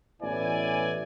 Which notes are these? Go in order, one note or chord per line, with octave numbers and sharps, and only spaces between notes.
A1 B2 E4 B4 D5 G#5